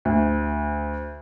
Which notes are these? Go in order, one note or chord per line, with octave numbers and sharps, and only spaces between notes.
D2